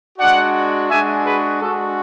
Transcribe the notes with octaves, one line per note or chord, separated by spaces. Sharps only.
G#3 D4 F#4 D5 F#5
G#3 D4 F#4 E5 G#5
G#4 B4
G#3 D4 F#4 A4